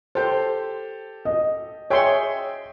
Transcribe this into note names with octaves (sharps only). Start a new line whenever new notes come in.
G4 A4 C5
D#5
G#4 C#5 E5 G5 C6